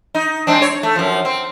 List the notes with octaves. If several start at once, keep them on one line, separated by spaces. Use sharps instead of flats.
D#4
G#3 C4 D4
C#5
A3
F#2 F3
C4